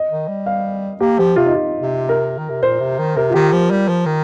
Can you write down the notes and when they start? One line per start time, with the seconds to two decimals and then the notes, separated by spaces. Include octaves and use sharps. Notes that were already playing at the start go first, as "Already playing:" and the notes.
Already playing: D#5
0.11 D#3
0.28 G3
0.46 F5
1.00 A#3 G4
1.19 F3 G4
1.36 C3 F4
1.46 D#4
1.55 F4
1.82 C3
2.09 A#4
2.38 D#3
2.50 C3
2.62 A#2 C5
2.80 C3
2.99 D#3
3.17 C3 A#4
3.30 F4
3.34 D#3 G4
3.52 F3
3.70 G3
3.88 F3
4.06 D#3